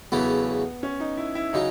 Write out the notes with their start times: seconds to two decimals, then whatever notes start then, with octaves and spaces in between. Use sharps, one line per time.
0.12 E2 C#3 F#3 A3 B3 E4
0.83 C#4
1.00 D#4
1.17 E4
1.35 E4
1.53 C#3 F#3 D#4